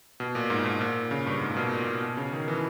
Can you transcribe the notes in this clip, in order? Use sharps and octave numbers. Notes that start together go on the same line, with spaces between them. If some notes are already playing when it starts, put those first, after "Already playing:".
B2
A#2
G#2
G#2
A#2
C#3
G2
G#2
A#2
B2
A#2
B2
C#3
D#3
E3